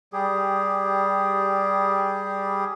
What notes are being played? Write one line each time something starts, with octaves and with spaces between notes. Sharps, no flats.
G3 G4 G#4